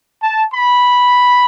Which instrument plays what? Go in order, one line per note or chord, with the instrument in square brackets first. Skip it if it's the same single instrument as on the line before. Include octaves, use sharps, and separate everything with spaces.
[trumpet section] A5
B5